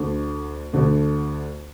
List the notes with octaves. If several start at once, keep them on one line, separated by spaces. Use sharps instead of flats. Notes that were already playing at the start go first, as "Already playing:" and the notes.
Already playing: D2 D3 A3
D2 D3 A3